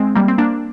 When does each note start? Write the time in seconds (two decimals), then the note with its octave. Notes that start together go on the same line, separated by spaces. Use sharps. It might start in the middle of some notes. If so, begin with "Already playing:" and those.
Already playing: G#3 C4
0.15 G3 A#3
0.28 C4
0.38 A#3 D4